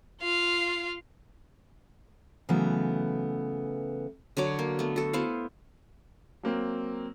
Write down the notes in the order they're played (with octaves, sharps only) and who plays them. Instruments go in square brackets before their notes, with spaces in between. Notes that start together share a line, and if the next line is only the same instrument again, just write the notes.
[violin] F4 F5
[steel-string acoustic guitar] C#3 E3 F#3 A3 B3
[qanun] D3 F#3 C#5 D6
A#3
A3 B3
F#4 A4
B3 E4 C5 F5
[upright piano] F#3 A#3 C4